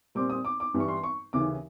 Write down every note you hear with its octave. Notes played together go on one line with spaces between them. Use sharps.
A#2 G3 C4 D6
D#6
D6
D6
G2 E3 G3
C#6
C6
C#6
D#2 C#3 E3 D6